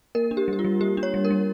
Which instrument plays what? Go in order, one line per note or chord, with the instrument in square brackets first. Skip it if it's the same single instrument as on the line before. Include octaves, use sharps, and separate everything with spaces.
[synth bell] A#3 A#4
D4
G4
G3 G4
F4
G3
A#3 G4
D4
C#5
G3
A#4
G3